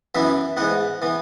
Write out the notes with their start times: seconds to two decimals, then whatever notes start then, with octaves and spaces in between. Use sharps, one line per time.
0.15 F#2 E3 B3 E4 E5
0.57 G#2 E3 B3 F#5
1.02 E3 B3